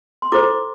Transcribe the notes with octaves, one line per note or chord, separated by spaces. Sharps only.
C6
E4 A4 C5 D6